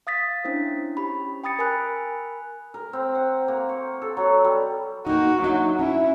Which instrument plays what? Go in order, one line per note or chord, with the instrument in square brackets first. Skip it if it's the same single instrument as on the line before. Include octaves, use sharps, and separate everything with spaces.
[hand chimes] F5 D#6 A6 B6
C#4 D4 E4 C5
C#4 G4 B5
G5 B5 D#6 A6 C#7
A#4 G#5 B5 F#6
[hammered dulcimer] A#4
C4
F#5
A#3
C#6
A4
F#3
G3
[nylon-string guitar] A#3 D#4 [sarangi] F#4
[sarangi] F#3 [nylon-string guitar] D4 D#4 E5
[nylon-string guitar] C#4 [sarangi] E4